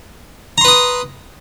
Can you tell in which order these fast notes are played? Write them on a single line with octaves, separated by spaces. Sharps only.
A#5 C6 B4 D#6